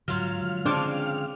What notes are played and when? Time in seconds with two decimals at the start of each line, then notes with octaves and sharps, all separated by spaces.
0.08 G#2 D3 F#3 F4 F5 F6
0.41 D3 F3 G#3
0.66 C#3 C4 D4 D5 D6